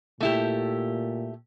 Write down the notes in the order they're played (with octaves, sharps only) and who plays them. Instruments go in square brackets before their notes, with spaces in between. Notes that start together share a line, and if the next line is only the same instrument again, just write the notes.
[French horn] A#2 [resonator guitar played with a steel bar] A3 E4 G4